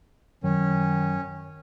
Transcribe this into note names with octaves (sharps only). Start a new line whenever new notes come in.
F#2 D#3 F#3 C#4